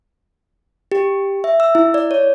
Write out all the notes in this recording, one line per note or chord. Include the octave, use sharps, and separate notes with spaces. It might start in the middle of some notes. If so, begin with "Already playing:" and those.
G4
E5
E6
E4
D5
C#5